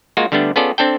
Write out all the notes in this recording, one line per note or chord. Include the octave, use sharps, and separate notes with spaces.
G#3 A#3 F4 F#4
D3 G3 A3 B3 D4
B3 C#4 F4 G#4 A4 D5
C4 D4 A4 G5